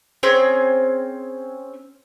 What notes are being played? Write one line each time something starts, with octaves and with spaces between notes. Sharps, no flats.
C4 C#4 G#4